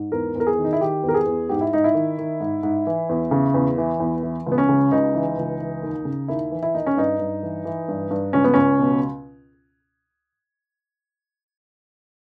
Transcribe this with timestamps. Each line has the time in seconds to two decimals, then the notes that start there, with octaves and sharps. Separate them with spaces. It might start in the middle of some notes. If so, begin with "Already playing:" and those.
Already playing: G#2
0.12 E2 A#4
0.35 E2 A#4
0.47 G#4
0.58 D#3
0.64 D#4
0.73 E4
0.81 D#3 G4
1.03 E2
1.09 A#4
1.14 G#4
1.26 E2
1.49 G#2 G4
1.61 E4
1.73 G#2 D#4
1.84 E4
1.94 D#3
2.18 D#3
2.40 G#2
2.63 G#2
2.87 E3
3.09 E2
3.31 C#3
3.54 E2
3.78 E3
4.00 E2
4.23 E3
4.46 C#2
4.52 B3
4.58 C#4
4.69 C#3
4.92 C#2 D#4
5.15 E3
5.38 C#2
5.60 E3
5.82 D#2
6.05 C#3
6.28 D#2 E4
6.52 E3
6.63 E4
6.74 D#2 D#4
6.86 C#4
6.97 G2 D#4
7.19 G2
7.43 E3
7.65 E3
7.88 G2
8.11 G2
8.33 C#2 C#4
8.44 B3
8.54 C#2 C#4
8.79 B2